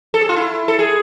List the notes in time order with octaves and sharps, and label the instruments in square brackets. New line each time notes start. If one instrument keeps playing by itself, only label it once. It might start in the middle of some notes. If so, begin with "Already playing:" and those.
[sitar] A4
G#4
F4
E4
A4
G#4